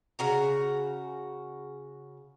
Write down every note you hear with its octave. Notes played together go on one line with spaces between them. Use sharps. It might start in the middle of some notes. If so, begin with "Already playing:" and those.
C#3 F#4 A#5